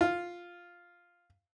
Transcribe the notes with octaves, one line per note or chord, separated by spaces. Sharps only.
F4